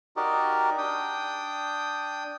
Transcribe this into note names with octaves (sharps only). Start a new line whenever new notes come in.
D#4 F#4 G4 A#4 D5 D#5
D4 G5 D#6